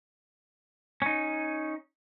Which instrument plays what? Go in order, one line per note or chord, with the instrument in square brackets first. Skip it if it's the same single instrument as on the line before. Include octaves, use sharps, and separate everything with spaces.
[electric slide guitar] C#4 D#4